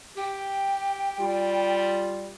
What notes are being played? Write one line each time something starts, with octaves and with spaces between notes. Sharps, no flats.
G4 G5
G3 F4